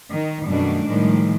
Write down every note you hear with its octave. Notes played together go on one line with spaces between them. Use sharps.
D#3
F#2 B2 D#3 G3 A3 D4
A2 D#3 F3 G3 G#3